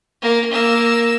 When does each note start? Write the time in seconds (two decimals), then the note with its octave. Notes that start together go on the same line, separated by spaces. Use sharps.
0.21 A#3
0.51 A#3 E6